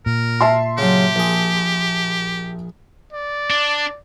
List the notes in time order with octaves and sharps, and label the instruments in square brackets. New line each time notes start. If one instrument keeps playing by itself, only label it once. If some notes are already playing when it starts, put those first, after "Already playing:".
[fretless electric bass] A#2 [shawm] A#4
[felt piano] E5 A5 C6
[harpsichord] C#3 F#3 [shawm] G4
[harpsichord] A#1 G#4
[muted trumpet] D5
[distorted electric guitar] D4